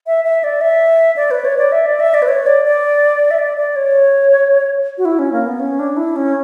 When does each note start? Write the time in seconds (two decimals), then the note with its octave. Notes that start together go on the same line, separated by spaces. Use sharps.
0.07 E5
0.25 E5
0.44 D5
0.61 E5
1.16 D5
1.31 B4
1.45 C#5
1.58 D5
1.72 E5
1.86 D5
2.00 E5
2.14 D5
2.22 B4
2.28 C#5
2.46 D5
2.65 D5
3.31 E5
3.39 D5
3.57 D5
3.76 C#5
4.98 F#4
5.05 E4
5.19 C#4
5.32 A#3
5.46 B3
5.60 C#4
5.79 D4
5.97 E4
6.16 C#4